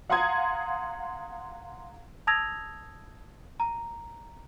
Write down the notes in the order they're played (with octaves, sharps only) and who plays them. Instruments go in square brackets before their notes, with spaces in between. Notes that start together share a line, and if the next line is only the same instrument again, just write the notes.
[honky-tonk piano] F5 F#5 A#5 C6 D#6 G#6
[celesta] A5 D#6 E6 G#6 A#6 F7
A#5